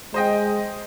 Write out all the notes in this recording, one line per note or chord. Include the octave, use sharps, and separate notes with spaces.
G#3 C5 D#5 G5